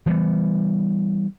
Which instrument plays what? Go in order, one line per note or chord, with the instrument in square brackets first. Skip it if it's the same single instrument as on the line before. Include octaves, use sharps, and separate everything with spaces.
[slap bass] E3 G3 B3